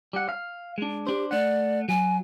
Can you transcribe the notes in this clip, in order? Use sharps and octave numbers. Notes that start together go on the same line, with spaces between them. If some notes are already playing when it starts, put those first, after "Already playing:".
G3 F#5
F5
G#3 D4
D4 G4 C5
A3 D5 F#5
F#3 G#5